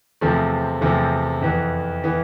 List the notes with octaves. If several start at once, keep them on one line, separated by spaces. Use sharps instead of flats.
E2 C3 F3 A3 C4
E2 C3 F3 A3 C4
F2 E3 B3
E3 B3